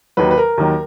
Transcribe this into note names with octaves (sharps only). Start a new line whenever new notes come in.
D#2 D#3 F#3 B4
B4
A#4
D#2 D#3 F#3